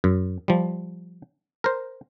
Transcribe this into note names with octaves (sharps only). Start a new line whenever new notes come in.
F#2
F3 G3
A#4 C5